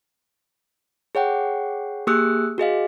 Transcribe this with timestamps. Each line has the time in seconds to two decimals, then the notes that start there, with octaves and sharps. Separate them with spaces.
1.15 G#4 C#5 F#5 G5
2.07 A#3 G4 G#4 D#6 E6 F#6
2.58 F#4 G#4 D#5 F5